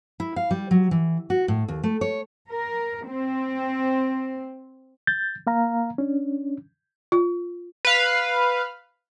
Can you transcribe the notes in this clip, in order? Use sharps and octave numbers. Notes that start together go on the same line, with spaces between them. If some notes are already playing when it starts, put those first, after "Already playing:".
E4
F5
G3
F#3
E3
F#4
A2
D#2
A3
C#5
A#4
C4
G6 A6
A#3 F5 A#5
C#4 D4
F4
B4 F5